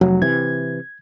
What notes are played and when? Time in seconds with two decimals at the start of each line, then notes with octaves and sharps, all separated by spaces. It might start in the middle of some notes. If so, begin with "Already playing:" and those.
0.01 F1 F#3
0.22 C3 E3 G#6